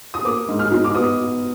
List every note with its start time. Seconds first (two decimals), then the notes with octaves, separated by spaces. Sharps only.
0.14 D#6
0.25 A#3 D6
0.48 G#2
0.59 F6
0.71 D#4
0.84 D6
0.94 B3 D#6